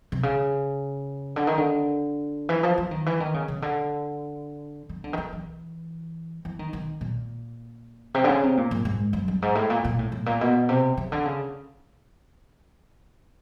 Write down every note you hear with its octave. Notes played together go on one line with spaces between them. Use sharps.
C3
C#3
D3
D#3
D3
E3
F3
E3
D#3
E3
D#3
C#3
C#3
D3
D#3
D3
D#3
D3
E3
E3
D#3
D#3
A#2
C3
D3
C#3
C3
A#2
G#2
G#2
F#2
G2
G#2
A2
A#2
A#2
A2
A2
A#2
B2
C3
C#3
D3
C#3